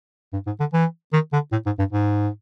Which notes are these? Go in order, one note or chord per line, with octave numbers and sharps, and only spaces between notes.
G2
G#2
D3
E3
D#3
D3
A2
G#2
G2
G#2